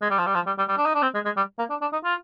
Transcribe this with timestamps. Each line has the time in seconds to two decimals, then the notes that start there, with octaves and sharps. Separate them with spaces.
0.02 G#3
0.10 G3
0.18 F3
0.26 G3
0.35 F3
0.47 G3
0.58 G3
0.68 G3
0.78 D4
0.86 D#4
0.95 D4
1.02 C4
1.14 G#3
1.25 G#3
1.37 G3
1.59 A#3
1.70 D4
1.81 D4
1.93 D#4
2.04 F4